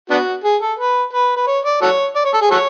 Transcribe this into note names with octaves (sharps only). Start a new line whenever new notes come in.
B3 D4 F#4
G#4
A4
B4
B4
B4
C#5
D5
F#4 A4 C#5
D5
C#5
A4
G#4
F#4 A4 C#5